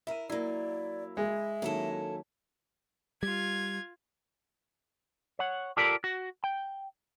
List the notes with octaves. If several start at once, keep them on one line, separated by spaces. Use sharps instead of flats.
E4 A#4 E5 D#7
F#3 A#3 E4 D5
G#3 E5
D#3 F#3 A#3 C#4 E4 A4
G3 F4 G#6
C#5 F#5
F4 G4 A4 A#4 D5
F#4
G5